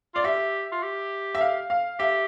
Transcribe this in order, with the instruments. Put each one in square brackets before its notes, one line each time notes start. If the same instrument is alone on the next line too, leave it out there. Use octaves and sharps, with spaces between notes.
[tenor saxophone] F4 [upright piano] D5
[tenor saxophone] G4 [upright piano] E5
[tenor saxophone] F4
G4
[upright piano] E5
F5
F5
[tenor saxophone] G4 [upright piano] E5